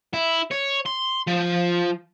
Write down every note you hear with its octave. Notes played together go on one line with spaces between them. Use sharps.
E4
C#5
C6
F3